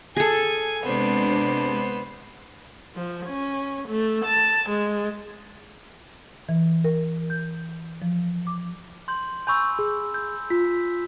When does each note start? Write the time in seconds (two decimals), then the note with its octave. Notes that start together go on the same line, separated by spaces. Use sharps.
0.17 G#4 A4 G#5
0.83 C3 G#3 B3 D4 C5
2.96 F3
3.26 C#4
3.89 A3
4.26 A5
4.69 G#3
6.49 E3
6.84 A#4
7.30 G6
8.02 F3
8.47 D6
9.08 C6 G6 F#7
9.47 G#5 B5 C#6 E6 G6
9.79 G#4
10.14 G6
10.50 F4 B6